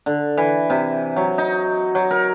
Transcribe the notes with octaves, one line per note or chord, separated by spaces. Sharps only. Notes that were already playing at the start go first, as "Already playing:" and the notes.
D3
E3
C3
F#3
D#4
F#3
A#4